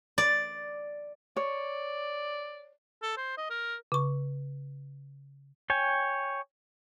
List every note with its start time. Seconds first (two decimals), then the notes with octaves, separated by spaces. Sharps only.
0.18 D5
1.36 C#5 D5
3.02 A4
3.17 C5
3.38 D#5
3.50 A#4
3.92 C#3 C#6
5.70 C#5 G5 G#5